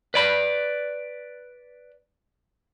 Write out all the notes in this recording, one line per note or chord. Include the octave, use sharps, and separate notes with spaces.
B4 D5 B5